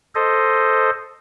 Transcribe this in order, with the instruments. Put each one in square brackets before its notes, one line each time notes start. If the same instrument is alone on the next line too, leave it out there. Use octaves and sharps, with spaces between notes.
[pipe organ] A4 C5 D#5